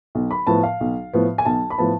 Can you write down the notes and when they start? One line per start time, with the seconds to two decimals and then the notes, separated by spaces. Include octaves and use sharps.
0.15 B1
0.31 B5
0.47 A2 F3 B3 A5
0.63 F5
0.81 B1
1.13 A2 F3 B3
1.38 G#5
1.45 B1 A5
1.70 B5
1.78 A2 F3 B3 A5